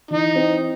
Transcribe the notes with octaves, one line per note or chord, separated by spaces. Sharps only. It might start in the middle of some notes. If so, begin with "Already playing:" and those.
E3 D#4
C4